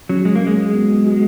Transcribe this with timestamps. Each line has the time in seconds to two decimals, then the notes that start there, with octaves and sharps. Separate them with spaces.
0.09 F#3 C#4 G#4
0.25 F#3 G#3
0.35 A#3
0.42 G#3 C#4 G#4
0.57 F#3 G#3
0.74 B3 F#4
0.90 F#3
1.04 B3 F#4